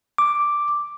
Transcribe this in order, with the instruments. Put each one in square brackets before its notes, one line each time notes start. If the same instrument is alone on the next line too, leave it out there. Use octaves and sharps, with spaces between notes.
[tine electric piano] D6